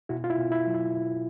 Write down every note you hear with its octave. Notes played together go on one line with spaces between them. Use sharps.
B2 E4 F#4
F4
E4
B2
E4
F#3
E4